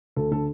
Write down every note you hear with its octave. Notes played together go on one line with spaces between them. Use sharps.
D2 A4
D3 A4